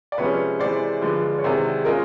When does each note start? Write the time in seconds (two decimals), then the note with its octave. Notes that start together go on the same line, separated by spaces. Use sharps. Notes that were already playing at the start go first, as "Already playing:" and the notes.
0.12 D5
0.18 C3 F3 G#3 C#4 B4 C#5
0.59 C3 E3 G#3 C5 D5
1.01 G2 D3 F3 G#3
1.39 C#5
1.43 E2 C3 D#3 G#3 C5 D5
1.85 G#3 C#4 F4 A#4 D#5